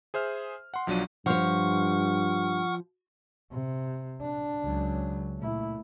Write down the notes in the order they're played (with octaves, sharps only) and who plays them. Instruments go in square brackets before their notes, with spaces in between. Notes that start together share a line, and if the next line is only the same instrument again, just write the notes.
[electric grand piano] G#4 C5 E5 F6
F#5 C6
B1 F3 F#3 D4 D#7
[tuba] G2 [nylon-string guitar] F3 C#5 [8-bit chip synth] F#5 C#6 F6
[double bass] C3
D4
[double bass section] C#2 F#3
[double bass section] A#2 [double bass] A3 E4